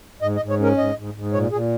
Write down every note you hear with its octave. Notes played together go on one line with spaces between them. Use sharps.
G#2 D#5
D#5
G#2
C#5
C#4 A#4
G#2 D#5
G#2
G#2
A#2 C#5
A#2 G#4